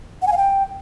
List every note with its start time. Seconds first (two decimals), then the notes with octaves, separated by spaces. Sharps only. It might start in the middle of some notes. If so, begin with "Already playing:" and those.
0.22 F#5
0.27 G#5
0.32 F5
0.37 G5